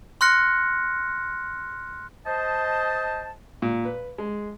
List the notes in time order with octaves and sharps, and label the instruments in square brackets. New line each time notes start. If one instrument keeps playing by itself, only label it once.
[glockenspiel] C6 F6 F#6 A#6 C#7
[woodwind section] C5 D#5 A5
[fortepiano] A#2
B4
G#3